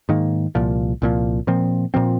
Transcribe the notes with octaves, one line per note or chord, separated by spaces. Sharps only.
G#2 D#3 A#3
C2 A#2 F3
C2 A#2 F3
A#2 F3 C4
A#2 F3 C4